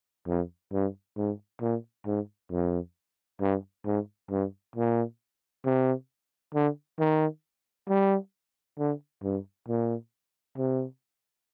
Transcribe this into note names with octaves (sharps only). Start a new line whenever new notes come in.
F2
G2
G#2
A#2
G#2
F2
G2
G#2
G2
A#2
C3
D3
D#3
G3
D3
G2
A#2
C3